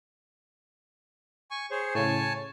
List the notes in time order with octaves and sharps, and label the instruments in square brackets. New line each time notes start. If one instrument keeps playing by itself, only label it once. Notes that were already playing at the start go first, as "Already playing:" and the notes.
[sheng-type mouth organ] G#5 C#6
G#4 C5 C#5
[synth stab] A2 C#3 [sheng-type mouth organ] C#5 G#5 A5